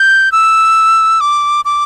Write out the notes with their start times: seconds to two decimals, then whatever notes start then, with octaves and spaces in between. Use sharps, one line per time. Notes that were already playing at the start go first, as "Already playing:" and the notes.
Already playing: G6
0.32 E6
1.21 D6
1.65 D6